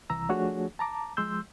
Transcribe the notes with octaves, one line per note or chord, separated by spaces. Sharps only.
C2 E3 A#5 E6
F3 A3 D4 F#4 G#4 C#5
A5 A#5 D6
F3 G#3 C6 E6 G6